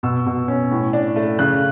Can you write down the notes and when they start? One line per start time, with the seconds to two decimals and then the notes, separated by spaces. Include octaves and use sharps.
0.03 B2 E6
0.26 B2
0.48 C#4
0.71 A2
0.93 D4
1.16 A3
1.39 C#3 F#6